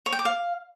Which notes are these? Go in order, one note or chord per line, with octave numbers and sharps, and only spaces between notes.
C#5
G5
D6
F5